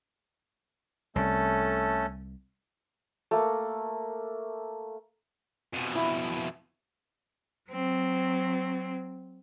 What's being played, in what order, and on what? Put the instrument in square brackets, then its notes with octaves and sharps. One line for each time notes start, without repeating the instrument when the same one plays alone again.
[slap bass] C2 [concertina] A3 C#4 A4
[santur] A3 A#3
[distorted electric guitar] F2 B2
[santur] E4
[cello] F#3 C4